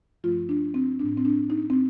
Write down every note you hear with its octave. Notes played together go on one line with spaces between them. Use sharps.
G2 F3 A3 F4
D4
C4
A2 A3 D4
C4
D4
D#4
C4